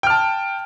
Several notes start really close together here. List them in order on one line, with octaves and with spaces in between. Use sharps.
G5 F6 A5